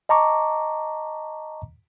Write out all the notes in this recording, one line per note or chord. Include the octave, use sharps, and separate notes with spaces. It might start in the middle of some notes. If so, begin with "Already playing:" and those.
D#5 A5 A#5 C#6 D6